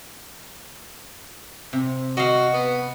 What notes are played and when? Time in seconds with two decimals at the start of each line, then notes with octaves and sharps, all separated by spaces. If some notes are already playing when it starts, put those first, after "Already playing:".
1.73 C3
2.17 F#4 D#5 F5
2.54 B3